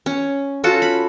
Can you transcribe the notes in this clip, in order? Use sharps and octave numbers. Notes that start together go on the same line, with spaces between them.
C#4
C#4 F4 F#4 A4
B5